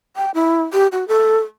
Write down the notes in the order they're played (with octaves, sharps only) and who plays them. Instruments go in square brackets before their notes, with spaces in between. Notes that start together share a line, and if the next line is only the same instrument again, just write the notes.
[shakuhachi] G5
E4
G4
F#4
A4